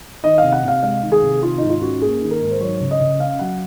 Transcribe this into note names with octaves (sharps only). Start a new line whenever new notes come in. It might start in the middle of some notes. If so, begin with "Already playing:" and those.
D#3 D#5
C3 F5
F#5
C3 F5
G#3 F5
D#3
G#4
C3
D#3 F4
G#2 D#4
F4
C#4 F#4
A#3 G#4
D#3
A#4
G#2
C5
F#3 C#5
C#3
D#5
C#3
C#4 F5
F#3 F#5